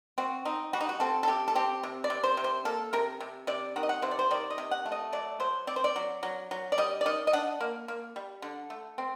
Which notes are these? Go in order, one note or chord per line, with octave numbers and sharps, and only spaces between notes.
C4 F#4
C4 D#4
G3 F#4
D#4
F#4
C4 A4
A4
C3 G4
A4
C4 G4
C3
D5
C3
C5
C3
C5
A#3 A4
C3 A#4
C3
C3 D5
D#3 F#5
D#5
F#5
C3 C5
D5
C5
D#3 D5
D#5
C3
F#5
A3
D#5
F#3 D5
F#3 C5
C4 D5
C5
D5
F#3
F#3
F#3
D5
G3 D#5
D5
D#3 D#5
D#5
D4 F#5
A#3
A#3
G3
D3
A3
C4